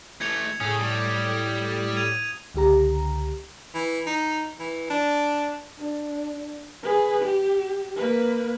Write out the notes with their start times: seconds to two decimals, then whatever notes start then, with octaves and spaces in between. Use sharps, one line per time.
0.21 E3 A3 G#6 C#7 F7
0.60 A2 C#4 G#4 D#6
0.79 G3 G4
1.97 G#6 D#7 F7
2.54 C#2 D3 G4 A#5
3.74 E3
4.07 D#4
4.60 E3
4.90 D4
5.78 D4
6.83 G#4 B4
7.21 G4
7.97 A#3 B4